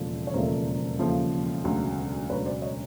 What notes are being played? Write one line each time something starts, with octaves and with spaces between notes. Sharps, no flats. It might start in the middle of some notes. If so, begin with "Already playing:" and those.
Already playing: E1 D#2 C#3 F3 A3
C#5
E1 D#2 C#3 F3 A3 A#4 C5
E1 D#2 C#3 F3 A3
E1 D2 C#3 F#3
E1 D2 C#3 F#3 B4 C#5
C5 D5
C#5 D#5